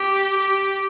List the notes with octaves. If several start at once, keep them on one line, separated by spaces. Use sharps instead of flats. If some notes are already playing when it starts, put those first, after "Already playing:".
Already playing: G4
G4